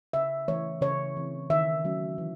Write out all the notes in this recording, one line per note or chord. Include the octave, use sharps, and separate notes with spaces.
C#3 E5
E3 A3 C#4 C#5
C#3 C#5
E3 C4
D#3 E5
F#3 A3 C#4
E3